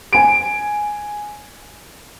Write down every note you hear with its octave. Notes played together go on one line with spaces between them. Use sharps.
G#5 D7